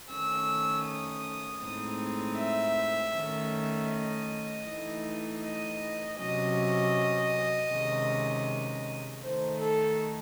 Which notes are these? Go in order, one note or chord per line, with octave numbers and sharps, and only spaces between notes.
D#3 A3 C#4 E6
D#6
A2 G#3 C4 D#4
E5
D#3 A3 C#4
D#5
E3 A3 D#4
D#5
C3 F#3 C#4 D#5
C3 D#3 G#3 C#4
D#3 A3 D#4 C5
A4